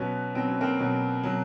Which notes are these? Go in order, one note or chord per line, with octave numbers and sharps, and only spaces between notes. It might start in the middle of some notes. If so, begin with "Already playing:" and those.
Already playing: B2 F#3 B3 C#4
B2 F#3 C4
C#4
A#3 C4
B2 F#3
B2 F#3